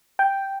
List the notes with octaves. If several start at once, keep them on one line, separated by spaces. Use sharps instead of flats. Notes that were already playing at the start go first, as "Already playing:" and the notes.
G5